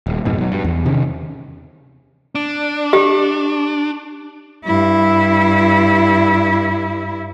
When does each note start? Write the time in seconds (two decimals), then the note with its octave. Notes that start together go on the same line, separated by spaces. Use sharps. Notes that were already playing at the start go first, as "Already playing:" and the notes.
0.07 D#1
0.25 F2 G#2 B2
0.38 B2 F#3
0.52 G2
0.64 E2
0.86 C3 D#3 C#4
2.35 D4
2.93 G4
4.65 G2 E4